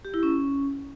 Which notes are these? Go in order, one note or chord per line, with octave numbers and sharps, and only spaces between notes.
G4
E4
C#4